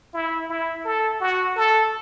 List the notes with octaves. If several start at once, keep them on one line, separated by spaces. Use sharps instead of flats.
E4
E4
A4
F#4
A4